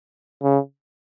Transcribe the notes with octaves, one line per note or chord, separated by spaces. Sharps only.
C#3